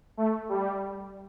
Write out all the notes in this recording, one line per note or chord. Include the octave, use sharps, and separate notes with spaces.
A3
G3